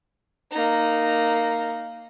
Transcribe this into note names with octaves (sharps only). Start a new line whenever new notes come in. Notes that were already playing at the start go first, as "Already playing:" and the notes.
A#3 D#4